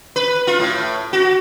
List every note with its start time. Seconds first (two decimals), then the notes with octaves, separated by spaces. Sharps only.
0.16 B4
0.47 F4
0.60 A2
1.13 F#4